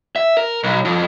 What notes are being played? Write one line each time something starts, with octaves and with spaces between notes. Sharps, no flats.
E5
A#4
B1
F2